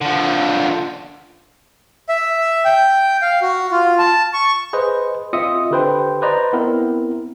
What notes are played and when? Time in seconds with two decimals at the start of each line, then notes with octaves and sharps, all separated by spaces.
0.01 D3 F3
2.09 E5
2.65 G5
3.22 F5
3.42 F#4
3.71 F4
3.99 A5
4.33 C#6
4.73 G#4 B4 C5 D#5
5.33 C4 F4 D#5 E5 D#6 C#7
5.71 D3 G4 B4 C5 G5
6.22 B4 C5 D5 D#5 A#5
6.53 B3 C4 E4 A#4